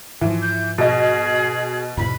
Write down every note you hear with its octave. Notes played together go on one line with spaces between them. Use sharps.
G#2 E3 F3
G6
B2 G#4 D#5
E2 G#2 B2 B5